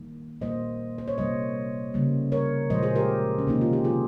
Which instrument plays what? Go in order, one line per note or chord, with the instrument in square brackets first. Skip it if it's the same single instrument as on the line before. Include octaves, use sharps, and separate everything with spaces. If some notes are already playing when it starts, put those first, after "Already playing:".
Already playing: [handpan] D#3 G3 A#3
A#2 G3 A#3 C5 D#5
C5
C#5
C3 G3 A#3 C5 D#5
C#3 G3 A#3
A#4 C#5
A#2 F3 G#3 C5 D#5
G#4 C5
G4 A#4
C#4
C3 D#3 A#3 D#4
F4
G4
F4 G#4